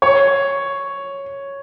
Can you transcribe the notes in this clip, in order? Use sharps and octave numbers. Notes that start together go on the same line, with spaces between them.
C#5